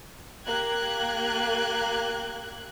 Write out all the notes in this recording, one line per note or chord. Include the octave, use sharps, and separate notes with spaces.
A#3 G4 F#6 G#6